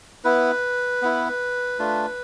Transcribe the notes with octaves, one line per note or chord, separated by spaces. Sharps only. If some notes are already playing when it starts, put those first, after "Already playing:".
B3 E4 B4
B3 E4
A3 D4 F4